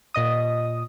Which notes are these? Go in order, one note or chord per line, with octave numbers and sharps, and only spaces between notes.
A#2 D#5 D#6